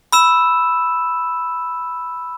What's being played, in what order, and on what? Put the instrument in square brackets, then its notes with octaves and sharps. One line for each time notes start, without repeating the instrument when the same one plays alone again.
[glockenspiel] B5 E6 E7